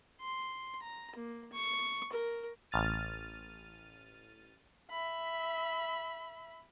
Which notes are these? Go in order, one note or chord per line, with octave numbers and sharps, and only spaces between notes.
C6
A#5
A#3
C#6
A#4
A1 F6 A6 D#7
E5 B5